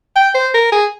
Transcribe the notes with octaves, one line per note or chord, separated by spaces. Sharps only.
G5
C5
A#4
G#4